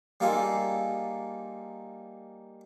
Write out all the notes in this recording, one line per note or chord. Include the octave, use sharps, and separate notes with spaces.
G3 A#3 D#4 F4 G#4 A4